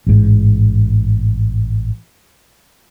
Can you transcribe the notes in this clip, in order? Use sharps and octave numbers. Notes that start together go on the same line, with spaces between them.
A1 G#2